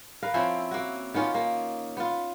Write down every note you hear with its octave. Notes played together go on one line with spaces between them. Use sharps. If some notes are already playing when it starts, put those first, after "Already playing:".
A#4 B4 F5
F3 C4 C#4 E4
A#3 F#4
D#3 B3 C#4 F4
A#3
B3 F4